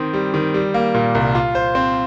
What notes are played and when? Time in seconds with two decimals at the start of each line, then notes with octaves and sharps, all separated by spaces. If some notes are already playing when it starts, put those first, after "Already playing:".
Already playing: D#3 C4
0.13 G3
0.34 D#3
0.54 G3
0.74 A#3
0.94 A#2
1.15 C2
1.35 F4
1.55 C5
1.75 C4